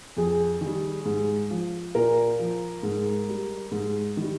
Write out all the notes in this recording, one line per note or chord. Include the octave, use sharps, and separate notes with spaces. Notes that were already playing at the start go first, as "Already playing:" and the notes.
F2 G#4
D#3 G3
G#2
F3
A#2 A#4
F3
G#2
G3
G#2
D#3 G3